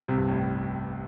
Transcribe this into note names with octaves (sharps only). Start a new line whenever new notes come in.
C2 C3
G2
A1 A2